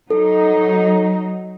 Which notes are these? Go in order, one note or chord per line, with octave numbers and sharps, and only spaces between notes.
F#3 D#4 A4